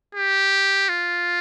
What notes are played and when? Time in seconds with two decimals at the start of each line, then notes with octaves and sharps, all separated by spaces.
0.15 G4
0.89 F4